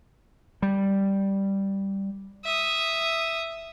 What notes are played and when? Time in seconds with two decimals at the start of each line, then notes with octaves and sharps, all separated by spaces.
0.62 G3
2.45 E5 D#6